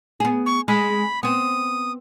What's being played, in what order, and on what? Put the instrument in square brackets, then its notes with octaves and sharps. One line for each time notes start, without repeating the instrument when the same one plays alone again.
[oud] B3 G#4
[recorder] C#6
[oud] G#3 [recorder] B5
[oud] B3 C4 [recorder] D#6